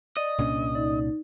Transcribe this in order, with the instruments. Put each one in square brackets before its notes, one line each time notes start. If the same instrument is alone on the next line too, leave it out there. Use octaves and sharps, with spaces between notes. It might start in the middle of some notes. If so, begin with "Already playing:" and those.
[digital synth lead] D5 [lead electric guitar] D#5
[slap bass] C2 A#2 C#4 [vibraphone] D4
[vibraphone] D#4 [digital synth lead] D5